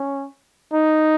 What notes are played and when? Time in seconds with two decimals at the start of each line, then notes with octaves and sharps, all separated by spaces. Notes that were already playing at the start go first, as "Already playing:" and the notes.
Already playing: C#4
0.73 D#4